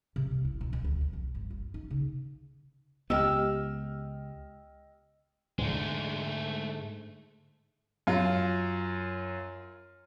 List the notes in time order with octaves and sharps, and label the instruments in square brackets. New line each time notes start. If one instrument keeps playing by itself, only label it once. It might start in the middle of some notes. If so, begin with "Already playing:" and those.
[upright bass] C3
D#1
E4
B2
F2
D2
F3
B1
G1
F4
D#4
C#3
[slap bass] C#2 B3 [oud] G4 [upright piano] D#5 G5 F6 [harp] E6
[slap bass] G#2 D3 [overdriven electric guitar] G#3 A3
[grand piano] F#2 F4